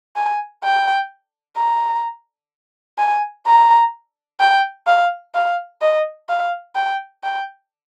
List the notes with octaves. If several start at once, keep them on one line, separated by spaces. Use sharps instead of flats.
G#5
G5
A#5
G#5
A#5
G5
F5
F5
D#5
F5
G5
G5